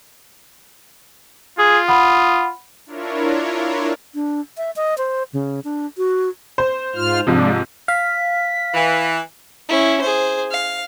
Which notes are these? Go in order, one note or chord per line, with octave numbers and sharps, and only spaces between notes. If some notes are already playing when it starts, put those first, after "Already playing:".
F4 G#4
F#5 B5 D#6
D4 E4 F4 A#4 C#5
D4
E5
D#5
C5
C#3
D4
F#4
C5
G#2 F4 F6
G#2 C3 F3 G#3 D4
F5 B6
E3
C#4 E4
G#4 C5
F5